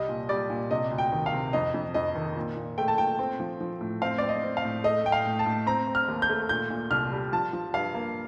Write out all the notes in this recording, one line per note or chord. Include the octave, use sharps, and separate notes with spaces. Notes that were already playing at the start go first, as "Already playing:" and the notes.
Already playing: C2 G3 D#5
A#2
G3 D5
A#2
C3 D#5
D2
G5
D#3
F5
C3
F2 D#5
F2
F2 D#5
D#3
A#2
A#2
A3 G5
A5
A#2 G5
C4
F3
F3
A2
C4 F5
C4 D5
D#5
C4
F5
A2
A3 D#5
A2 G5
F5
A2
A5
A2
C4 A#5
C4
F6
D#2
G6
A3
A#2 G6
A#2
C2 F6
G3
F3 A5
F3
G2 F5
A#3